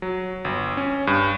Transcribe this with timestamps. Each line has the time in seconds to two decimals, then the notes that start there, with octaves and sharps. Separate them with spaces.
0.02 F#3
0.45 G1
0.77 C#4
1.07 G2